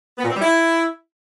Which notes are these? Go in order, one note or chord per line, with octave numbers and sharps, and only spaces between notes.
B3
A#2
C4
G3
E4